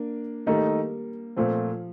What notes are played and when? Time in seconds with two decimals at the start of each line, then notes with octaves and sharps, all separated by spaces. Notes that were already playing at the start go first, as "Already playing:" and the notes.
Already playing: A#3 D4
0.46 D#3 G3 A3 A#3 D#4
1.36 A#2 F3 A3 C4